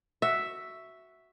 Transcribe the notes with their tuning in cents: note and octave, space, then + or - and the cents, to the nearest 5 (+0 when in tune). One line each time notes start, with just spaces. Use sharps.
F#4 +0 E5 +0